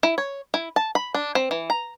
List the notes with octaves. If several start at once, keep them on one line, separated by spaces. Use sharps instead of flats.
E4
C#5
E4
A5
B5
D4
C4
E3
A#5